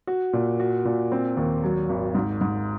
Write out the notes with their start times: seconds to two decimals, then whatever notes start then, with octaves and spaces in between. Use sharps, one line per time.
0.07 F#4
0.33 A#2
0.60 F#4
0.85 A#2
1.12 C4
1.37 D#2
1.63 F#3
1.89 G#1
2.15 G#2
2.41 G#2